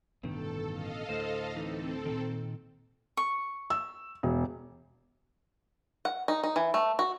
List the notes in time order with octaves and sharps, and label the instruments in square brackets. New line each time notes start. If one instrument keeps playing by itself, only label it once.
[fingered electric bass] A1 B2 D3 [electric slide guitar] G2 D#3 [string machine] A4
[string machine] A4 D#5 F5
[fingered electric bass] D2 A2 [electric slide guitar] C5
[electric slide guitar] E3 D#4 [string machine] C4 A4
[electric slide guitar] A#2 D#3
[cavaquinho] C#6
[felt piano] E6
E1
[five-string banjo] F#5
D#4
D#4
E3
A3
F#4